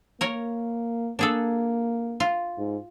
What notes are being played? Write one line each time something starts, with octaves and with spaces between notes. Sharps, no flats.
A#3 A#4 C#5
A#3 D4 G#4 A4
F4
G#2